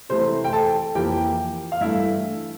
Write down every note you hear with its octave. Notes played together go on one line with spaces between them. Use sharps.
C3 E3 A3 C5
G5
A4 A5
F2 E3 A#3 G4 G5
F5
G2 E3 A3 E4 E5